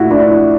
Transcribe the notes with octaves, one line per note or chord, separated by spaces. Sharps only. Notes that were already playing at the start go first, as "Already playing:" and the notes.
Already playing: A#2 F3 A3 E4 F#4
D4 E4